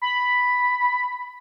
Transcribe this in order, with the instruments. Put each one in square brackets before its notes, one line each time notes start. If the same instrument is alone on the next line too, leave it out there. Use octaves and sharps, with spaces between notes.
[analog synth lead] B5